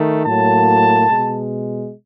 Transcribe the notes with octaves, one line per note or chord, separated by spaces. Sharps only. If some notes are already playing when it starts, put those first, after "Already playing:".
Already playing: D#3 A3
A2 F#3 A#3 A5
B2 G#3